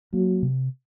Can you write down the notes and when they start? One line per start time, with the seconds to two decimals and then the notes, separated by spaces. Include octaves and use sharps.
0.13 F#3 A#3
0.42 C3